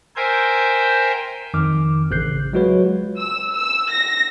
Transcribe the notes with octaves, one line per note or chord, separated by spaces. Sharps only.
A#4 C5 E5 G5 G#5 G6
F2 D#3 D6 F6
A1 C#3 F#6 G6 C7
F#3 G#3 F4 F#4 B4 C#5
E6
E6
A#6